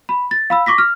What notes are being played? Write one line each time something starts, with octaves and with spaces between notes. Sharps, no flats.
B5
A6
F5 B5 E6
C#6 D6 A#6 B6
F6